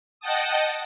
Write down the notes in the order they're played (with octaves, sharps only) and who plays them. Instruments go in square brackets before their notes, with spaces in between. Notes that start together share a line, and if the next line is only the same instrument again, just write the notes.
[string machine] D#5 F#5 G5 A5 D#6